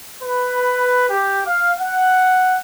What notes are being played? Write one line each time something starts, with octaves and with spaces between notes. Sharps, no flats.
B4
G4
F5
F#5